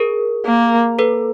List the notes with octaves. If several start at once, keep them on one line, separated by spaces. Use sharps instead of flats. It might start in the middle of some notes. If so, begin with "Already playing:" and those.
Already playing: G#4 A#4
A#3
A4 B4